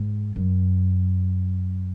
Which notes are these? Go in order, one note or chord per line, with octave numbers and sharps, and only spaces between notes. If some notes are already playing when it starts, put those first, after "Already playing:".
Already playing: G#2
F#2